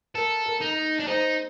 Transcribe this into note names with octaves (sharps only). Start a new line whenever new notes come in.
A4 A#4
A#4
D#4
D4
D#4 C5